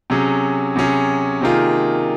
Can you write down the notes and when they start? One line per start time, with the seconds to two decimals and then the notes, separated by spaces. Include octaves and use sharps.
0.10 C3 F#3 C#4 G#4
0.76 C3 F#3 C#4 G#4
1.41 C3 D#3 A#3 F4 G#4